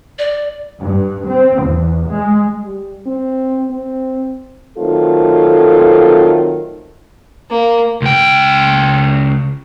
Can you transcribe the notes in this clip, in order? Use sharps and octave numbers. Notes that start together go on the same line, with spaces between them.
D5
G2
C4
E2
G#3
G3
C4
C4
D#3 F#3 A3 C4 F4 A4
A#3
C#2 G5